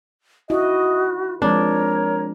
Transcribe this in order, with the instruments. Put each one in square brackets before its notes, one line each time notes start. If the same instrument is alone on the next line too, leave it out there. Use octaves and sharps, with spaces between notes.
[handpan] D#4 E4 [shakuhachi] F#4 [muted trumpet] D#5
[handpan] F3 G#3 C4 [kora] D4 [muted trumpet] A#4 [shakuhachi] C#5